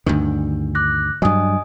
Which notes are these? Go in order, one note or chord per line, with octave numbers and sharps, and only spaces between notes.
D2 G2 D#3 D4
D6 F#6 A#6
G2 F#3 D#5 G#5 D#6